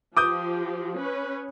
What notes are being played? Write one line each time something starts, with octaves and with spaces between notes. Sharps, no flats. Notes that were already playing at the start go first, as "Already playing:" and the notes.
F3 G4 D6 D#6 G6
C#4 B4